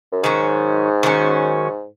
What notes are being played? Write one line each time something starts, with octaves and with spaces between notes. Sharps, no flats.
F#2
G#2 D#3 F#3 C#4
D#3 F#3 C#4